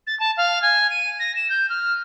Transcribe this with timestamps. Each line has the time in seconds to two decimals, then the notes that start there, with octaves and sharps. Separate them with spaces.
0.07 A6
0.20 A5
0.37 F5
0.62 G#5
0.90 D#7
1.19 A#6
1.36 E7
1.49 G6
1.69 F6